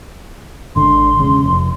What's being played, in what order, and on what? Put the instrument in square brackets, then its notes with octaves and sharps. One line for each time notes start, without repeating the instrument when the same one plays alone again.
[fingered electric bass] G#1 D3 [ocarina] C6
[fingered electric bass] E1 C#3
F1